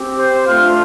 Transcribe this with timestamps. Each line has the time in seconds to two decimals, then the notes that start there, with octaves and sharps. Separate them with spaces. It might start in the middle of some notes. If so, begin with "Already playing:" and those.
Already playing: C4 G4
0.18 C5
0.46 A3 D4 F4 F5